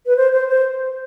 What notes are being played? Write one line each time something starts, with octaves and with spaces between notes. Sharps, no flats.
B4
C5
C5
C5